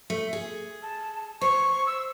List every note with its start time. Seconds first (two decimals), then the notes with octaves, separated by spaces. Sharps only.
0.10 A3
0.33 G#4
0.83 A5
1.41 C5 C#6
1.87 E6